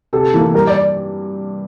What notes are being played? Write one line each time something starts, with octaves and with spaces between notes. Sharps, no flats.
C3 A4
E3 A#3
G2 A#4
D5